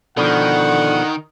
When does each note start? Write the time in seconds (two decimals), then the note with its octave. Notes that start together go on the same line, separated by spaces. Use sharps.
0.17 B2 D3 D#3 F3 F#5